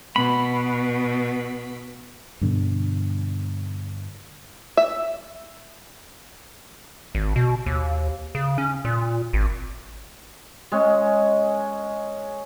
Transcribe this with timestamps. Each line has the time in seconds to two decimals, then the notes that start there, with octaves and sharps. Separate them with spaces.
0.16 B2 B5
2.41 G2 B2 D3
4.77 E5
7.15 G#1
7.36 B2
7.66 D#2
8.35 C#3
8.58 C#4
8.85 A#2
9.33 G#1
10.72 G#3 C#4